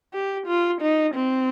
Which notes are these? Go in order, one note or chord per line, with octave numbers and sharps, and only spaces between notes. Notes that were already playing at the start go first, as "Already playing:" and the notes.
G4
F4
D#4
C4